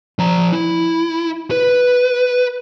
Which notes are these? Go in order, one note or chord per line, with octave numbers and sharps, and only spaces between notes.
F3 A#5
E4
B4